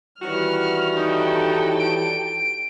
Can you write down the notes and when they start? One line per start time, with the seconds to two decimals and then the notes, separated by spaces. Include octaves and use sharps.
0.21 D#3 E3 G3 C#4 F#4 F6
0.96 D#4 A4 G5
1.80 D7